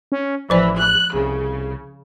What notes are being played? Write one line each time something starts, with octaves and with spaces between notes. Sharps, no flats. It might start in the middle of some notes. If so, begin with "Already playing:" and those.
C#4
A1 E3 F3 C5 D5
F#6
C2 C#3